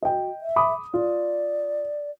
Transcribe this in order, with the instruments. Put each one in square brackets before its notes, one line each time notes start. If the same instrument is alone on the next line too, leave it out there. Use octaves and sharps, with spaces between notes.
[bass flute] F#4 [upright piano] D#5 G5
[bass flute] E5
[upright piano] B5 D6 D#6
[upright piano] F4 [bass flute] D5